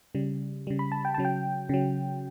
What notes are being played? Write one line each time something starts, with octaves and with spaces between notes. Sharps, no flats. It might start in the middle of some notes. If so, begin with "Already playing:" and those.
C#3 G3
C#3 G3
B5
A5
G5
C#3 F#3 A5
G5
C#3 F#3